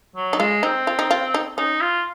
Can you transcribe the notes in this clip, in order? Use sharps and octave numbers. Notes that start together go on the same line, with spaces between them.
F#3
D#4
G#3 F4
C4 D#4
F4
D#4
F4
D#4
C#4 D#4
F4